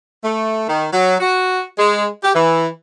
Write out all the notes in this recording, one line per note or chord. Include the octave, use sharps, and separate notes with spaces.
A3
D#3
F#3
F#4
G#3
G4
E3